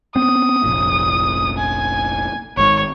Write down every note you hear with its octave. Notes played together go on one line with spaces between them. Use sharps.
B3 C4 D#6
F1 A#1 A#2
G#5
G#1 G#2 C#5